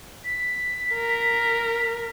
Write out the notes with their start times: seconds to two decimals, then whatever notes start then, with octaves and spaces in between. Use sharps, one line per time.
0.25 B6
0.94 A#4